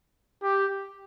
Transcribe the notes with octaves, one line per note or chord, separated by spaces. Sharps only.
G4